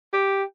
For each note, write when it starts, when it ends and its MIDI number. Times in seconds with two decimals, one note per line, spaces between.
0.13 0.44 67